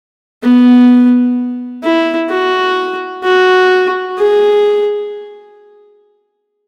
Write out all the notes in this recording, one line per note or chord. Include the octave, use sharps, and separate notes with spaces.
B3
E4
F#4
F#4
G#4